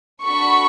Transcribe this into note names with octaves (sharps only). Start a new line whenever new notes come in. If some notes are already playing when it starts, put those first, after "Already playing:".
D4 F#4 A4 B5 C#6